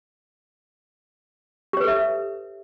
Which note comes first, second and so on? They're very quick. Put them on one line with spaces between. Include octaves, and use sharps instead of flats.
G4 C#5 B4 A4 E5